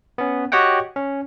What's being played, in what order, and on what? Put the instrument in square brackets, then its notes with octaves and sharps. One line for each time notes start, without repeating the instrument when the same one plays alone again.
[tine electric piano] B3 C#4
F#4 G4 C#5 D#5 F#5 G5
C#4